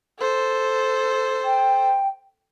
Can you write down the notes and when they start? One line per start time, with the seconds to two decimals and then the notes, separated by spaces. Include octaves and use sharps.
0.19 A4 C5
1.45 G5